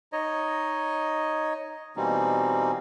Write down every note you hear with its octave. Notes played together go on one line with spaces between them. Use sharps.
D#4 C#5 D#5
B2 E3 G3 A#3 C4 D#4